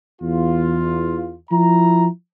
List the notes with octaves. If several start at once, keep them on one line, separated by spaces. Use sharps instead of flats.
E2 F4
F3 E4 A#5